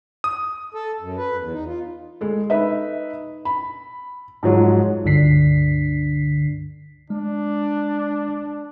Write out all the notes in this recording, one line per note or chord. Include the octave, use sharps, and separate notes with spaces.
D#6
A4
F#2
B4
E2
D#4
F4
G#3 A4
D#4 B4 E5
B5
G#2 F3 F#3 G#3
C#2 G2 D3 D4 B6 C7
G#3 D4